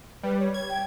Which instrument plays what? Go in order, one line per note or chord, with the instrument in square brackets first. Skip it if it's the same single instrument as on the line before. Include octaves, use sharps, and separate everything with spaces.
[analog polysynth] G3 [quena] B4
[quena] C#5
[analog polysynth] G#6
[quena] G5